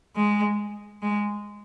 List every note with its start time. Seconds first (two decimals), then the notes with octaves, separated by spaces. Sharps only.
0.16 G#3
1.02 G#3